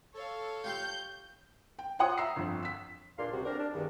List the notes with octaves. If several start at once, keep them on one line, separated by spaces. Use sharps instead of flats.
A4 C#5 F5
F4 G4 C6 G6
G5
F4 C5 C#5 F#5 C6 D#6
E5 A#5 E6 C7
G1 F2
E6 B6
E2 A#2 D4 A#4 F5 C6
C#2 C3 G3 F#4
C4 D4 A#4
D4
E2 G2 D#3